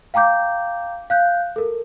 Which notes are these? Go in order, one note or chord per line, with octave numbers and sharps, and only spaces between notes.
F5 G5 A#5 D6 G6
F5 F#6 G6
A4 A#4